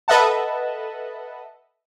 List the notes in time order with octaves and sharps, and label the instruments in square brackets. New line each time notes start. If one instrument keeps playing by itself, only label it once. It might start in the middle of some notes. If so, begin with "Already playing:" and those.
[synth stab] A4 B4 D#5 E5 F#5 A5